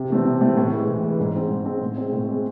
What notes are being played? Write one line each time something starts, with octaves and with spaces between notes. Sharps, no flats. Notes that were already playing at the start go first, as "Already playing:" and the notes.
Already playing: C3
E3 A3 C4
C3
E3 A3 C4
A2
E3 G#3
A2
E3 G#3
G#2
G#3 C4
G#2
G#3 C4
A2
G#3 C4
A2
G#3 C4